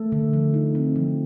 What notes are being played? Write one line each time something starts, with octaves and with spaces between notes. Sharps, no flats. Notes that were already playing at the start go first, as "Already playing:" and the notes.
Already playing: A3 A4
D3
F3
D#4
C4
F3